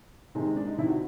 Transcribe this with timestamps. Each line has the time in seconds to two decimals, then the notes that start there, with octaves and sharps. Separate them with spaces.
0.35 C3 D#3 G#3
0.46 G#3
0.56 D4
0.67 D#4
0.78 C3 D#3 E4
0.88 F#4